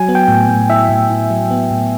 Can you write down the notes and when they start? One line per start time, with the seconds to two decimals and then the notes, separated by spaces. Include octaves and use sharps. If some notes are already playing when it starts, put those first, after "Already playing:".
Already playing: F#3 G#5
0.09 B3
0.15 G5
0.28 A2
0.49 A2
0.69 E4 E5
0.89 A2
1.10 E4
1.30 F#3
1.51 B3
1.71 A2